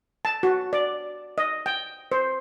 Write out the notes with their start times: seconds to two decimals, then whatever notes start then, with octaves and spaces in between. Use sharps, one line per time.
0.25 A5
0.43 F#4
0.73 D5
1.38 D#5
1.66 G5
2.12 C5